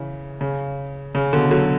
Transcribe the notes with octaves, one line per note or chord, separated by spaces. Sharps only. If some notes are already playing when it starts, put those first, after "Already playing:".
Already playing: C#3 E3
C#3
C#3
B2 D3
D3 F#3